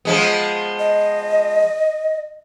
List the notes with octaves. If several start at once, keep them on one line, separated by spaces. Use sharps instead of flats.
F3 G#3 B3
D#5